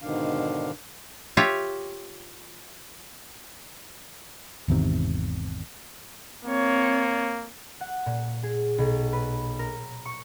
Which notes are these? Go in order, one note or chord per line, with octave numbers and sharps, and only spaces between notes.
G#2 B2 D3 D#3 D4 F5
F4 G4 C#5 E5 F5
G#1 E2 C3 D#3
A#3 C4 C#5
F#5
A#2
G#4
B1
B4
A#4
C#6